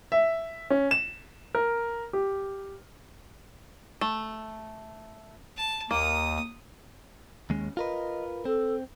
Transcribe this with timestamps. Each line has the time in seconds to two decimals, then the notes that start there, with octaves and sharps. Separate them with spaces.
0.12 E5
0.70 C#4
0.91 E7
1.55 A#4
2.13 G4
4.01 A3
5.56 A5
5.91 D#2 A#3 D#6
7.50 D#2 G#3 C#4
7.77 F4 A#4 B4 D#5
8.45 C4 A4